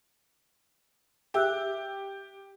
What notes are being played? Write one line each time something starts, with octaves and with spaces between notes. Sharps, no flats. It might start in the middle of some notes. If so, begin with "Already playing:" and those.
G4 E5 E6 F#6